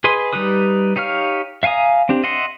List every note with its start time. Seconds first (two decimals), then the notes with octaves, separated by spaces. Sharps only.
0.04 G#4 B4 D#5 C6
0.33 G3 D#4 G4 B4 D#6
0.96 D#4 G4 C#5 F5 F6
1.63 E5 F5 G#5 A#5 D#6
2.09 C4 D4 G4
2.24 D#5 E5 F#5 C6